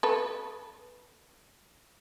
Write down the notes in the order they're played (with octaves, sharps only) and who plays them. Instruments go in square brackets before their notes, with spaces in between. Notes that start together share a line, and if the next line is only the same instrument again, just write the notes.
[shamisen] A4 B4